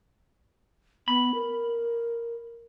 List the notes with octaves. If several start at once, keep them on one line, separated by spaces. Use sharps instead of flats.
B3 B5
A#4